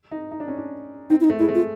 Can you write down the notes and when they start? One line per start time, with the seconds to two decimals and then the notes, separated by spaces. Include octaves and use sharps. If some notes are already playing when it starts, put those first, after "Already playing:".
0.11 D#4
0.32 D#4
0.40 D4
0.48 C#4
0.58 D4
1.10 C4 D#4
1.21 E4
1.24 D#4
1.30 A3
1.39 G#3 E4
1.49 A3
1.55 F4